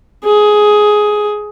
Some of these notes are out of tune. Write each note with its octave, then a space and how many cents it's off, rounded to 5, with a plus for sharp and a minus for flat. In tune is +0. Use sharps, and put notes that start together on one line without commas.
G#4 +10